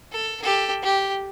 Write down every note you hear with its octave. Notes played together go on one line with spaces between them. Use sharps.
A4
G4 A4
G4